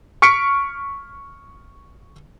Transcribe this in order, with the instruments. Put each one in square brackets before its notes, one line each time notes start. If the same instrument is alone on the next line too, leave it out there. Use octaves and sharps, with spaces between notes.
[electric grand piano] C#6 F6 B6 C#7 D7